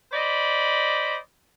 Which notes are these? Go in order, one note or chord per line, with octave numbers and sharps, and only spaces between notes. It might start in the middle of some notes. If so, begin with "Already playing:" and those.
C5 D5 D#5 B5